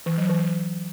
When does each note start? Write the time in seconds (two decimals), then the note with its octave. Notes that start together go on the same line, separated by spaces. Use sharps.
0.06 E3
0.18 F#3
0.29 E3